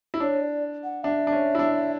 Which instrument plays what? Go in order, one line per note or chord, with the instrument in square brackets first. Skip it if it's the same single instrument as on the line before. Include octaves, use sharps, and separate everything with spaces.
[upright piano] E4
[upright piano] D4 [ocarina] C#5
[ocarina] D5
F#5
[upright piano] D4 [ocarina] E5
[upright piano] D4
C#4
E4
D4